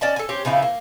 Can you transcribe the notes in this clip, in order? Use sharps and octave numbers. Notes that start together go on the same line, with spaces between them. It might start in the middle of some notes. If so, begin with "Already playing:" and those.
C#4 D5 D#5 A5
A4 G#5
C4 C#4 G4
C#3 F3 D#4 E4
A#3